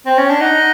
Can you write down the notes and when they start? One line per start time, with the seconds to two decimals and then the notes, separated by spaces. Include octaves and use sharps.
0.06 C4
0.18 C#4
0.30 D4
0.40 D#4 F#5